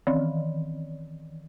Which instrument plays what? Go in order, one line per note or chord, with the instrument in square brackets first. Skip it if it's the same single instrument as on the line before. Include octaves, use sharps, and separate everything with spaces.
[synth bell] D#3 E3